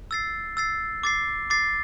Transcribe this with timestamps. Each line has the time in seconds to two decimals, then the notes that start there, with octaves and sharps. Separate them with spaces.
0.11 E6 A6 C7
0.57 E6 A6 C7
1.03 D6 A6 C7
1.50 D6 A6 C7